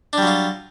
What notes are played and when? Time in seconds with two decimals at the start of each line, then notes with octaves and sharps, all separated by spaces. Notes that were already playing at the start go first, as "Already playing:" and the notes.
0.13 D4
0.18 G3
0.22 F#3
0.27 F4